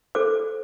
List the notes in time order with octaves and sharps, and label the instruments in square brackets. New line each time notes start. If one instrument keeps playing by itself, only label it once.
[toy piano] A4 C5 D6